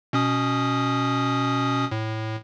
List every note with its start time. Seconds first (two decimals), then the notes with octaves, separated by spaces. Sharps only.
0.13 B2 C#4 D#6
1.92 A2